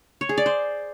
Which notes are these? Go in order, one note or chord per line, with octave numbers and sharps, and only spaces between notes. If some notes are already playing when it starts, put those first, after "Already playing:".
C#5
G#4
D5
C5